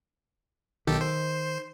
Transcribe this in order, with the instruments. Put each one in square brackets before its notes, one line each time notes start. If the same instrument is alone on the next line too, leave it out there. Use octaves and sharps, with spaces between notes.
[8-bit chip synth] B1 G4 A4 [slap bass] D#3
[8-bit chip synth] C5